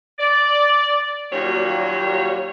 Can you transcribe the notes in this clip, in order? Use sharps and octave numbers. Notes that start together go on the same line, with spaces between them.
D5
D#2 A#2 F#3 G3 F#4 C#5